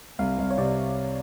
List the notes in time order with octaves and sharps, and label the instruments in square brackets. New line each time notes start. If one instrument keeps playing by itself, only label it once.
[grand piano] C2 [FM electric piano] F5
[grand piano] C2
[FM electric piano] C#5
[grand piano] C3 [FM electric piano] D5